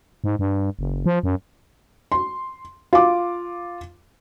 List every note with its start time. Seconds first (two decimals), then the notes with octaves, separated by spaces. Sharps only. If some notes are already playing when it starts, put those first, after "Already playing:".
0.24 G#2
0.39 G2
0.79 F#1
1.06 F3
1.23 F#2
2.12 C6
2.93 F4 D6